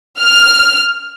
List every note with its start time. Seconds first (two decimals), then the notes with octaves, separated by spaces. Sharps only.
0.19 F6